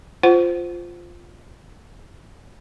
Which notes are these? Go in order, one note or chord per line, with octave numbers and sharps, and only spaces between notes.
F4 C5 F#5